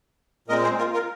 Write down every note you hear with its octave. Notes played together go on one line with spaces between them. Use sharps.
A#2 G#3 C4 A#4 D#5
G#4 C5
F4 A#4
F4 A#4